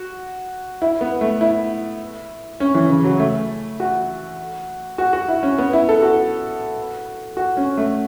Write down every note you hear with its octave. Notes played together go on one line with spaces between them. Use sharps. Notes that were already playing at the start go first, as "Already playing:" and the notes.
Already playing: F#4
E4
B3
A3
E4
C#4
E3
C#3
F#3
A3
F#4
F#4
F#4
E4
C#4
B3
E4
A4
F#4
F#4
C#4
A3